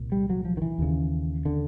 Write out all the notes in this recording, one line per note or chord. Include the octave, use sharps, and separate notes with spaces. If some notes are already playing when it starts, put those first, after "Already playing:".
Already playing: C2 A#2
G3
F#3
F3
D#3
E3
D#2 C#3
D3